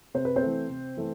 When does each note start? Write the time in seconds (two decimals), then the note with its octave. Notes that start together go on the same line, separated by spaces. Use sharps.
0.14 C3 C5
0.25 B4
0.36 C4 C5
0.42 E3 A3
0.70 C3
0.97 E3 A3